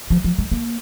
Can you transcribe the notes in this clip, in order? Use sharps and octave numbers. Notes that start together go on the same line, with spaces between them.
F3
F3
G#3
A#3